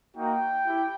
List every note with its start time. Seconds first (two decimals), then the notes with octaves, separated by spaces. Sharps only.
0.16 A#3 D#4 F#4 G5
0.67 E4 G4